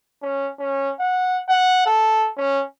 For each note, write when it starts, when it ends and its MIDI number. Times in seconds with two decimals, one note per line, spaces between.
0.23 0.49 61
0.59 0.91 61
1.00 1.39 78
1.49 1.82 78
1.86 2.29 69
2.37 2.63 61